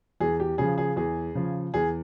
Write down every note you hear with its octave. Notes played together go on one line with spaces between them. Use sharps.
E2 G#4
G4
C#3 F3 G#4
G#4
E2 G#4
C#3 F3
E2 G#4